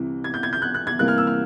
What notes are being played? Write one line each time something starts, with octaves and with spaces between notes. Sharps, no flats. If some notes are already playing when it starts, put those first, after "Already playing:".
Already playing: C2 C3 E3
G#6
G6
G#6
G6
F#6
F#6
G#6
C3 E3 G3 A#3 F#6
F6
E6
F6